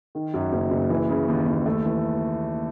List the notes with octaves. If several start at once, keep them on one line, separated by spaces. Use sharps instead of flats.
D#3
F#2
F#1
F#1
E3
C#3
D#2
D#2
A3
E3